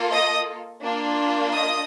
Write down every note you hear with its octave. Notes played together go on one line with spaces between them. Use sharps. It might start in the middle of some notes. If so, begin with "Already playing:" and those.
Already playing: A#3 F4 A4
D#5 D#6
A#3 D4 F4
D#5 D#6